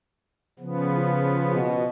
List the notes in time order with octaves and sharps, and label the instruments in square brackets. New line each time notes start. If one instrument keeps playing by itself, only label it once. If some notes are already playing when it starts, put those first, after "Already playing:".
[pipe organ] C#3 F3 B3
[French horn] F4
B2